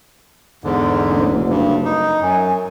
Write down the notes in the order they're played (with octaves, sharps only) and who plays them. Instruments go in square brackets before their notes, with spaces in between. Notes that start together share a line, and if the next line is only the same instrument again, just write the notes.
[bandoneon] E2 G#2 D3
[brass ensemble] F#1 D2
[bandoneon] G2
D#4
[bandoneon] F#2 [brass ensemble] G#5